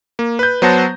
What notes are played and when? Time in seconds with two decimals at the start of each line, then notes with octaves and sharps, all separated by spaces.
0.19 A#3
0.39 B4 G6
0.62 F#3 B3 C5 F#5 A5 A#6